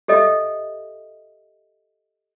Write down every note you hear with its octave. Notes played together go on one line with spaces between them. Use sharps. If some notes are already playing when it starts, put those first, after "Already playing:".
G4 A4 D#5 E5